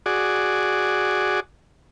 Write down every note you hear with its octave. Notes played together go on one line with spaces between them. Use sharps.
F#4 G#4 D5